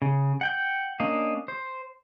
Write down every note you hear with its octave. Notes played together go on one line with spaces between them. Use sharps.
C#3
F#5 G5 G6
A#3 C#4 D4 D#5 F5
C5